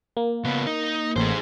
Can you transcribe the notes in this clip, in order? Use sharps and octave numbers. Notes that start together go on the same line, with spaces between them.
A#3
C#3 B3
D#4
A1 G#4 C5